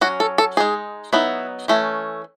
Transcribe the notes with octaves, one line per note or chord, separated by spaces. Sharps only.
F#3 C#4 F#4
A4
A4
G#3 D#4 G#4
F#3 B3 D#4 E4
E3 A3 C#4